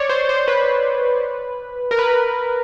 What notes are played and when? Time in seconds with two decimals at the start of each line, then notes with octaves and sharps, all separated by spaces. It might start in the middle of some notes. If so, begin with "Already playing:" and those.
Already playing: C#5 D5
0.09 C5
0.29 C5
0.48 B4
1.91 A#4
1.99 B4